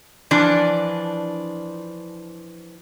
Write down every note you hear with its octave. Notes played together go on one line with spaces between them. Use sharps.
E3 F3 D4